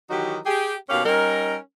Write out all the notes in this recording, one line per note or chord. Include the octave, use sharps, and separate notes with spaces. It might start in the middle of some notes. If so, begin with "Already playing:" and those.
D#3 E3 F#3 D#4 F#4 G4
G4 G#4
D#2 B2 C#4 G4 F5
G3 C#4 D#4 A#4